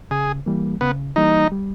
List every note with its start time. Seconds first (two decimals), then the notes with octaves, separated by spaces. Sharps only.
0.11 C#3 G#4
0.46 E3 G3 A#3
0.81 C#3 B3
1.16 E3 G3 A#3 D#4
1.52 G3